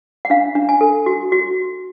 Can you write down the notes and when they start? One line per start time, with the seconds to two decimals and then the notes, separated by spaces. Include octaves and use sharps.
0.25 F#5
0.30 D4 F5
0.55 D4
0.69 G#5
0.81 A4
1.06 F#4
1.32 F#4